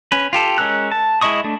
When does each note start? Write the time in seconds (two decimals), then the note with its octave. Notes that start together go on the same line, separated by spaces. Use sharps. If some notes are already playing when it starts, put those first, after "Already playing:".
0.12 C#4 B4
0.33 F4 G4 A4
0.58 G#3 C#4 A#4 E6 F#6
0.92 A5
1.21 G#3 E4 D#5 C#6 D#6
1.44 A3 D4